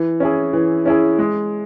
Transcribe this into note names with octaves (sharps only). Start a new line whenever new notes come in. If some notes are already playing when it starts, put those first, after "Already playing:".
Already playing: E3
C#4 E4 G#4
E3
C#4 E4 G#4
G#3